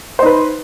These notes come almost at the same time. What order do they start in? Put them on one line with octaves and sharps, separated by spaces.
C5 D#4 B4